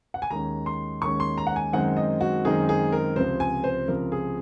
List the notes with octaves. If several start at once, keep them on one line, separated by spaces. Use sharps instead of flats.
F#5
G#5
D#2 D#3 G#3 C#4 A#5
C6
D#2 D#3 G#3 C#4 C#6
C6
A#5
F#5
G#5
F#2 D#3 G#3 C4 D#4 F#5
D#5
F#4
F#2 D#3 G#3 C4 D#4 G#4
G#4
A#4
C#2 C3 F3 C5
G#5
C5
C#2 C3 F3 A#4
G#4